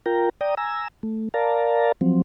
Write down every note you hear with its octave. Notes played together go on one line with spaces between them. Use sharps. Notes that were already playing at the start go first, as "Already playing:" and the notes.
F4 A#4 G5 A#5
D5 G5 A#5 D#6
G#5 A#5 E6
A3
A#4 D5 F5 A5 A#5
F3 F#3 C4